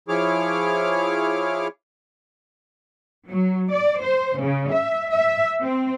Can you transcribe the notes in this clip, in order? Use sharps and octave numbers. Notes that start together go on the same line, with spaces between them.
F3 E4 G#4 C#5 D6 F6
F#3
D5
C5
C#3
E5
E5
C4